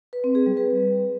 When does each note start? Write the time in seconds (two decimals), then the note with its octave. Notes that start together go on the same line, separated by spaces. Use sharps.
0.13 B4
0.24 C4
0.35 G#4
0.46 G3
0.57 B4